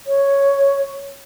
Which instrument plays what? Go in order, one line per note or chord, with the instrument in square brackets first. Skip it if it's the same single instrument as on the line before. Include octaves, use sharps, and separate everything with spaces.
[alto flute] C#5